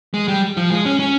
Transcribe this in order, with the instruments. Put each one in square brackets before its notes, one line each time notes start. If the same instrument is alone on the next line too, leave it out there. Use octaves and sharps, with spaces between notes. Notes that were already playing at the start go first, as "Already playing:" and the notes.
[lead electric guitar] G#3
G3
F3
G#3
C#4
C#4